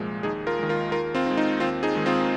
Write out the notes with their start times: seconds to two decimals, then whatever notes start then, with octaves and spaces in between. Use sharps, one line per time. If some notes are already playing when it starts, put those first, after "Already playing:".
Already playing: C2 A#2 F3 G#3
0.23 D#2 D#4 G#4
0.47 F4 A#4
0.59 D#3 G#3
0.69 F4 A#4
0.92 D#2 F4 A#4
1.15 C4 F4
1.26 D#3 G#3
1.37 D#4
1.60 D#2 C4 F4
1.83 D#4 G#4
1.95 D#3 G#3
2.06 C4 F4